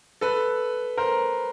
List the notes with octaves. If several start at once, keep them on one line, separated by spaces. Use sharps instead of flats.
A4 B4
A#4 C5